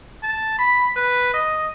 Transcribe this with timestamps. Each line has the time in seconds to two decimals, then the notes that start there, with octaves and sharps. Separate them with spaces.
0.23 A5
0.58 B5
0.96 B4
1.33 D#5